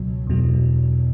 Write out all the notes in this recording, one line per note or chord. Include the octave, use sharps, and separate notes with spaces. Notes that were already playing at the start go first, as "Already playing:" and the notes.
Already playing: C#2 B2 F#3
E2 B2 F#3